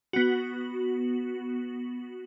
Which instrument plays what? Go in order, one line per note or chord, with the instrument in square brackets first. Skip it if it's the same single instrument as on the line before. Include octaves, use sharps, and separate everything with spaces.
[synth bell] B3 F#4